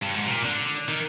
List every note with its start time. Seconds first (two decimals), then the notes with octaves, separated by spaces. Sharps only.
0.03 G2
0.16 G#2
0.26 C3
0.31 A#2
0.45 D3
0.88 D#3